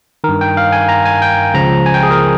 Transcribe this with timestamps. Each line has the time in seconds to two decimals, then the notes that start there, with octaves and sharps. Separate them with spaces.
0.24 G2 D#3 A#4
0.41 G5
0.57 F5
0.72 G#5
0.89 A#5
1.05 G#5
1.22 G5
1.54 C#2 C#3 F3 A#5
1.86 G#5
1.94 G5
2.03 G#4
2.11 A#4